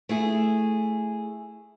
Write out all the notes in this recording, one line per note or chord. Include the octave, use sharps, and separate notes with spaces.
A3 E4 G#4